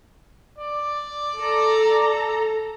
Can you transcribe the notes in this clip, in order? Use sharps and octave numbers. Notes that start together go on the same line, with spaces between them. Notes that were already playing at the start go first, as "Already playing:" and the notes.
D5
A4 A#5